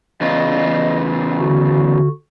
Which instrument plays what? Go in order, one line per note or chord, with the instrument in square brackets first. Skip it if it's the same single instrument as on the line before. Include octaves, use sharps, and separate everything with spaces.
[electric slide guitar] E2 C#3 F4 [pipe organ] D#5
[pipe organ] D3 F#4